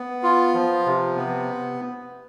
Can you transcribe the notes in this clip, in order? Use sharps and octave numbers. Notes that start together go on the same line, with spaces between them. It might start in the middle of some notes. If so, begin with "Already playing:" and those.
Already playing: B3
F4
F3
C3
B3